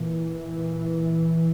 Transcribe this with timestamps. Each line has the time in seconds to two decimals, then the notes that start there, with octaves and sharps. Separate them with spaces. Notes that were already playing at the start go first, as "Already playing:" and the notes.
Already playing: A#2 E3
0.51 A#2